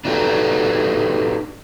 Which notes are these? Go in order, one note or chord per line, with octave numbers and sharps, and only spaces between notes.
D4 D#4 F#4 G4 A4 B4